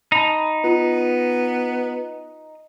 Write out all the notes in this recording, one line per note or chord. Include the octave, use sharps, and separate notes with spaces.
D#4 A5 B5 F7
B3 F4